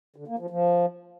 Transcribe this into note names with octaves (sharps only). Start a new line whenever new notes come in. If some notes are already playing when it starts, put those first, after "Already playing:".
D3
A#3
F3
F3